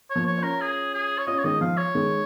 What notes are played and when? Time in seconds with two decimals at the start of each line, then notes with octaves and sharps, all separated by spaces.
0.10 C#5
0.16 F3 A#3
0.26 C#5
0.38 C#4 F4
0.43 A#4
0.61 G#4
0.94 G#4
1.18 C#5
1.27 C#4 F4 D#5
1.38 C#5
1.44 D#3 G#3 D#5
1.61 F3 F5
1.77 C#5
1.95 D#3 G#3